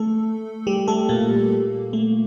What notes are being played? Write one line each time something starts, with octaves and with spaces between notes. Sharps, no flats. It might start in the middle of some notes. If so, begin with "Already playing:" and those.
Already playing: A3 A4
G3 G4
A3 A4
A#2 A#3
A3